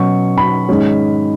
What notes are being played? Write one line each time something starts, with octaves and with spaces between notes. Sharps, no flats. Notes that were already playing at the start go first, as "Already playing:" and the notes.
Already playing: B2 F#3 C#4 C#6
B5
G#2 D#3 G#3 C#4